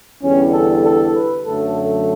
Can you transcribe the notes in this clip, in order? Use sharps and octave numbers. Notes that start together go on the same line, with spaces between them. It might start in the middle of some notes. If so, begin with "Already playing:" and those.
E2 D3 G3 C#4
A4
A4
B4
F#2 D3 F#3 A3 A4
A4